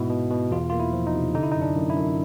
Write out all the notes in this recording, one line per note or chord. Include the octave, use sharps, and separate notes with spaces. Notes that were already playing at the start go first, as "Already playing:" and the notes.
Already playing: G#2 B2 B3 E4
B2
B2
E2 F4
A#3 F4
E4
F3
D#4
C3
D3 D#4
E4
D#4
F#2
D4
F#2
E4
F#2